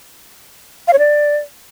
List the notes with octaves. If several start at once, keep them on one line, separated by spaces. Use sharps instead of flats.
F5
C#5
D5